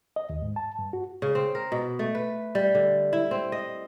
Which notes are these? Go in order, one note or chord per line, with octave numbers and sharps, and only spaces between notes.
D#5
D#2
G#2
A5
G2
F#4
C#3
C4
A#4
B2
A3
B4
G3
D3
E4
C4
D#5